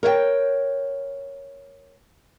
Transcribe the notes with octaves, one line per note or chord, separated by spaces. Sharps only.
A#4 C#5 E5 G5